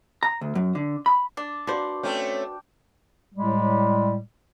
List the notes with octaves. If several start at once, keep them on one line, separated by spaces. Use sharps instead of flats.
A#5
D2
F#2
D3
B5
D4 D6
F3 D4 F#4 B4 C5 D5
A3 C4 C#4 G5
A2 G3 G#3